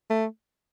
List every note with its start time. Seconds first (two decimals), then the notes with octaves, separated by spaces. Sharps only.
0.10 A3